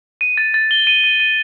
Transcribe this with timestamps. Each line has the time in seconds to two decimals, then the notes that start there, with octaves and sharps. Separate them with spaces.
0.21 D#7
0.37 A6
0.54 A6
0.71 G7
0.87 D#7
1.04 D#7
1.20 D#7